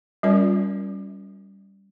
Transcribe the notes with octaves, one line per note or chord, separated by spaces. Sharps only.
G3 C#4 F4 A#4 D5